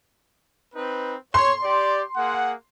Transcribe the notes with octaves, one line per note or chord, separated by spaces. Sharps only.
C4 D#4 B4
C#5 C6
G4 D5
A#3 G#4 F#5